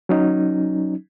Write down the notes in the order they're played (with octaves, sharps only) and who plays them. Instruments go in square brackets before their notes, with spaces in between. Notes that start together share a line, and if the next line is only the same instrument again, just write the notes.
[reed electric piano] F#3 C#4 D#4